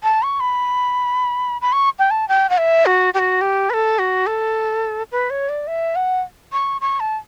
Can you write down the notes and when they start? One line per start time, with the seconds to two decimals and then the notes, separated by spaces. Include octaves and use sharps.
0.03 A5
0.22 C#6
0.40 B5
1.61 B5
1.72 C#6
1.99 G5
2.10 A5
2.28 G5
2.49 F#5
2.58 E5
2.86 F#4
3.14 G4
3.19 F#4
3.41 G4
3.70 B4
3.73 A4
3.99 F#4
4.26 A4
5.12 B4
5.30 C#5
5.49 D5
5.67 E5
5.96 F#5
6.52 C#6
6.81 C#6
7.00 A5